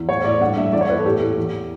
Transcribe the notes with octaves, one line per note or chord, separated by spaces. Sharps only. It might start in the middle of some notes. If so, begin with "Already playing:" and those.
Already playing: E2
A2 C#5
A2 D5
G2 F#5
G2 E5
E2 D5
C#5
E2 B4
A4
A2 G4
A2
E2